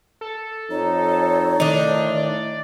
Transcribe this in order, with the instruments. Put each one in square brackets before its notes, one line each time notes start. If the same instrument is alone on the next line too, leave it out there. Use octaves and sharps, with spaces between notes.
[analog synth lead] A4
[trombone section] F2 D#4 [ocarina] C#5
[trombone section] A2 [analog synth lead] D#3 [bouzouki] D4 D#4
[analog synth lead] D5